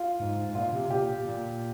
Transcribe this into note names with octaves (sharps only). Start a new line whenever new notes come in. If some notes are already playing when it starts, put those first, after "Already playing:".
Already playing: F4
G#2
G#2
A#2 F4
C3
A#2 G4
A#2